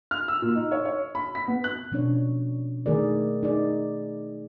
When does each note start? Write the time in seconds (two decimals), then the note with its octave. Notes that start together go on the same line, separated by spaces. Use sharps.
0.11 F6
0.28 E6
0.42 A#2
0.55 D#4
0.71 C#5
0.85 C#5
1.15 B5
1.35 B6
1.48 B3
1.64 F#6
1.92 B2 F3 C#4 D4 C#5
2.86 D#3 A3 G#4 A#4 D5
3.43 D#4 G#4 D5